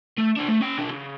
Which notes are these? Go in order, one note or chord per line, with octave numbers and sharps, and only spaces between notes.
A3
D4 C5
A3
C#4 G5
B1 D4
C#3